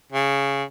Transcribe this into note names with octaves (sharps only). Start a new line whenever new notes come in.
C#3